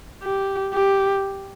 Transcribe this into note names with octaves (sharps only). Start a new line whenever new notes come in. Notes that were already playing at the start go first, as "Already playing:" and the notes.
G4
G4